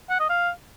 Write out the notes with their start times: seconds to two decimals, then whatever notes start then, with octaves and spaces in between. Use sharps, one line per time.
0.10 F#5
0.20 D#5
0.30 F5